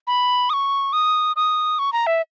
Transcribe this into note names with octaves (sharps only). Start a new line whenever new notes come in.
B5
D#6
C#6
D#6
D#6
C#6
A#5
E5